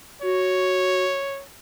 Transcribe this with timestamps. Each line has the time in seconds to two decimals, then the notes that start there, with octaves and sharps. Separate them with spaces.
0.22 F#4 C#5